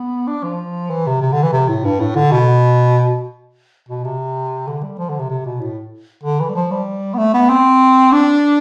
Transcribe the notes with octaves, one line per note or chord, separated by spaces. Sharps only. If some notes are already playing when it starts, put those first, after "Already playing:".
Already playing: B3
D4
F3
E3
C3
C3
D3
E3
C3
A2
G2
A2
D3
B2
B2
C3
D3
G3
F3
D3
C3
C3
B2
A2
D3
E3
G3
F3
G3
B3
A3
B3
C4
D4